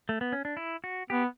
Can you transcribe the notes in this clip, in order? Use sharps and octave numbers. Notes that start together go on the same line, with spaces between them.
A3
B3
C#4
D4
E4
F#4
B3 G4